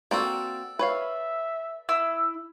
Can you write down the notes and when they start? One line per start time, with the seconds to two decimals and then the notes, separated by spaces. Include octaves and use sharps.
0.11 A#3 C4 F#4 A4 D5
0.79 B4 C#5 E5 F5
1.89 E4 E6